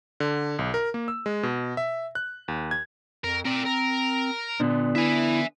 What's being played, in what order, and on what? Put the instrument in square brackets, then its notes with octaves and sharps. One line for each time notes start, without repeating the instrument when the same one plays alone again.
[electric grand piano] D3
B1
A#4
A#3
E6
G#3
B2
E5
F#6
D#2
G#6
[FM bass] F2 [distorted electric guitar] A#4
[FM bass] C4 [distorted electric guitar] A#4 D5
[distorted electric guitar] A#4
[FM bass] A#2 [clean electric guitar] D3 B3 D4
[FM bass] E4 [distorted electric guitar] E5 G#5